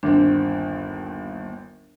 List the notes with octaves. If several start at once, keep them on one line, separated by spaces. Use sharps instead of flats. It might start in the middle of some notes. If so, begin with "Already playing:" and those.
G1 D#2 C4 D4